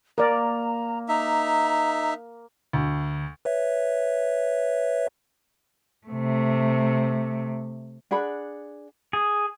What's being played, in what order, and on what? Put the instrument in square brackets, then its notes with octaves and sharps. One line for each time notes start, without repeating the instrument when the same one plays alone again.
[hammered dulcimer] A#3 [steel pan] A#4 D5 [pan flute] A#5
[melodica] D#4 E5 [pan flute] A#5
[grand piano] D2
[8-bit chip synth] B4 C#5 E5
[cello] C3 A3
[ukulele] D4 G#4 F#5 B5
[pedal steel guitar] G#4